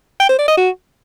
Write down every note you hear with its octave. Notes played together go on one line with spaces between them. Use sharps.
G5
C5
D5
D#5
F#4